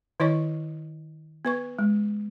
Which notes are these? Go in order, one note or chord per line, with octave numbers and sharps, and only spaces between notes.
D#3 E4 C#5 D#5 C#6
B3 B4 C#6
G#3